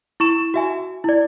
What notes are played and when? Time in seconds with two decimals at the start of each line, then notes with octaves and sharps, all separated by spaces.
0.20 E4 C#6 E7
0.54 F#4 E5 G#5
1.04 E4 D5